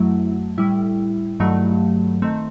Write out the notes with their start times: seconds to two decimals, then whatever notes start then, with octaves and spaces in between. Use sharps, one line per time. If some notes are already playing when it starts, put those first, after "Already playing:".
Already playing: F#2 F#3 A3 E4
0.58 A2 G3 E4
1.40 G2 D#3 F#3 A3
2.22 D#3 A3 C4